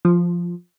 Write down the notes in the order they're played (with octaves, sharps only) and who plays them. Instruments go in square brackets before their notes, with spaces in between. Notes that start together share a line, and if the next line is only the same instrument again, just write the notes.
[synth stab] F3